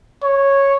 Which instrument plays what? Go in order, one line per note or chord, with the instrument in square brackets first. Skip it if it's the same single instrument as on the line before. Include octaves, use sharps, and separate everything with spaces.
[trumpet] C#5